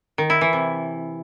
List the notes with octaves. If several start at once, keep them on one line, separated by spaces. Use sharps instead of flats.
D#3
E4
E3
C3